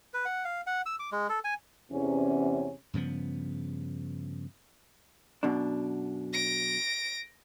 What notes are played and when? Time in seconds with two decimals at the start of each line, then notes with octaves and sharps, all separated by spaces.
0.14 B4
0.25 F#5
0.45 F5
0.67 F#5
0.86 E6
0.99 D6
1.12 G#3
1.29 A4
1.44 G#5
1.92 E2 C3 C#4
2.93 G2 C#3 F3 B3
5.43 F#2 B2 D4
6.33 A#6 D7